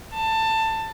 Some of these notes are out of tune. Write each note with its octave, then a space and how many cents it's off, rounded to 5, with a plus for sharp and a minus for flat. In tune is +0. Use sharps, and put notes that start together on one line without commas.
A5 +15